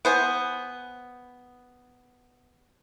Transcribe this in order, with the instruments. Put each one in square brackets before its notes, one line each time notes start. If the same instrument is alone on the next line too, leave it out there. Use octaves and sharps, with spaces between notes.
[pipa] B3 C5 G#5